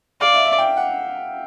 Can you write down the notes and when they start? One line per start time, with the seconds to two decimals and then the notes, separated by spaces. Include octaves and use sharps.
0.21 D5 F5
0.33 E5
0.45 E5
0.58 G5
0.77 F#5